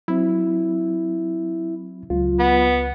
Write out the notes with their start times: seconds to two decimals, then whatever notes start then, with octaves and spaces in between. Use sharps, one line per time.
0.08 F#3 C4 E4
2.10 C#2 F#3 F4
2.39 B3